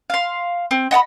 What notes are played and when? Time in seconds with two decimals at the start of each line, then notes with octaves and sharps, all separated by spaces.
0.10 F5 C6
0.71 C4
0.91 D#5 F#5 A5 B5